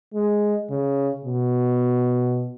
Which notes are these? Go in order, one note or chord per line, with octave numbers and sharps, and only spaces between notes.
G#3
C#3
B2